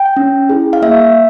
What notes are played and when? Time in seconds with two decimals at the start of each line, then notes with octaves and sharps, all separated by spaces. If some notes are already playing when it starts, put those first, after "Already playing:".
Already playing: G5
0.16 C#4
0.49 E4 G#4
0.73 F5
0.82 A#3 E5